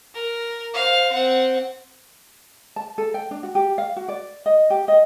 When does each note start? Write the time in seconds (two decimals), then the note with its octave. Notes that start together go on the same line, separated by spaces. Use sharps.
0.14 A#4
0.74 C5 F5
1.12 C4 F#5
2.76 A5
2.98 A4
3.14 G5
3.31 D4
3.43 F#4
3.55 G4
3.78 F5
3.96 F#4
4.08 D5
4.46 D#5
4.70 G4
4.88 D#5